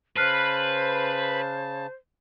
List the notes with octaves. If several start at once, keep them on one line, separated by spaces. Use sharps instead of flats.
C#3 B4 C5 A5 F6 F#6 C7